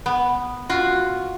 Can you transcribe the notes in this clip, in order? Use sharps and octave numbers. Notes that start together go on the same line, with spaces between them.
B3
F4 F#4